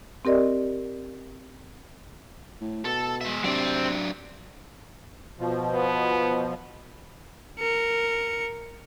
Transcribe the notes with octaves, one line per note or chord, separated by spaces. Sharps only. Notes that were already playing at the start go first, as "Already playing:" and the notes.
C4 G4 A#4 D5 D#5
A2
B2 A4
G#3 E5
C3 F#3 C4 D4
B2 F3
B3
A#4 C#7